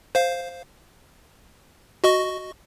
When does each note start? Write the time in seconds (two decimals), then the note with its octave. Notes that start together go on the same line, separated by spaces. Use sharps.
0.15 C5 F5
2.04 F#4 D#5 C#6